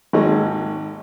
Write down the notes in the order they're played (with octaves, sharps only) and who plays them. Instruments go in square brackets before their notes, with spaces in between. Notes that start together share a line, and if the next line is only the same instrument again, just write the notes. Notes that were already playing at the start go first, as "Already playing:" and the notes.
[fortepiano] G#1 D#2 G#3